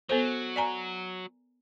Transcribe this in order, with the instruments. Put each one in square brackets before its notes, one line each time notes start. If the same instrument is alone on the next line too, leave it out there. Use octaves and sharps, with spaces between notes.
[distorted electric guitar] F#3 [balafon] B3 A4 C5
[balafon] D5 G#5 A#5